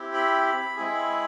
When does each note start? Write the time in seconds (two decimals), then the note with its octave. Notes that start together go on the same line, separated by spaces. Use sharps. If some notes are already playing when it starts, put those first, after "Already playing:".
Already playing: C4 E4 G4
0.14 B5
0.76 G#3 C4 E4 G#4